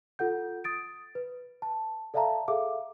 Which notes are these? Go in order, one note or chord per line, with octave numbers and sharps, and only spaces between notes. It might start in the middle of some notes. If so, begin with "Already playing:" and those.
F4 A4 F#5 G6
D#6 A6 D7
B4
A5
A4 D5 E5 F5 A5 A#5
G#4 A4 E5 F5 D6